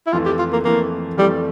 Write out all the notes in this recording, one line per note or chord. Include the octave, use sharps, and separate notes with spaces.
E4
F2 E3 A3 F4
G4
F4
A#3
F2 E3 A3 A#3
F2 E3 G3 A3